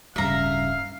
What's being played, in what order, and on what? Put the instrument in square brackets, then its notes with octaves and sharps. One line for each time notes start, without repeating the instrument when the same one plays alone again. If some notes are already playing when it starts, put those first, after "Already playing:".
[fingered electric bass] D1 G2 C#3 [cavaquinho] E5 A#5 [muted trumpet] F5